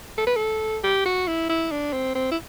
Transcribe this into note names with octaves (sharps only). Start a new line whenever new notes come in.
A4
B4
A4
G4
F#4
E4
E4
D4
C4
C4
E4